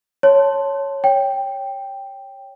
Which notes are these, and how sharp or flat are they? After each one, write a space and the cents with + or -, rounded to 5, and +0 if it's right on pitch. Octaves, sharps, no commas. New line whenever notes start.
C#5 +0 A5 +0 C6 +0
C#5 +0 G5 +0